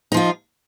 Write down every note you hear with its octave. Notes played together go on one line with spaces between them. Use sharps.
F3 D#4 F4